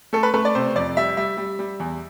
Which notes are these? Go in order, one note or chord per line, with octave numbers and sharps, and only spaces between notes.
A3 A4
B4
A3 B4
D5
C3 C5
F2 D5
G3 E5
G3 E5
G3
G3
E2